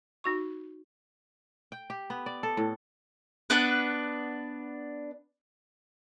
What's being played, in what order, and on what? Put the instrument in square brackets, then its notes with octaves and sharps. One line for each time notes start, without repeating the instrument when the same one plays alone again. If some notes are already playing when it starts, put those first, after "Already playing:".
[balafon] D#4 F#4 C#6
[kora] G5
G4
B3
D5
A4
A2
[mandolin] B3 D4 B4